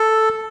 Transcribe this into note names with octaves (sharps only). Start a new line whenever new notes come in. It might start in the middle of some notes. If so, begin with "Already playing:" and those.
Already playing: A4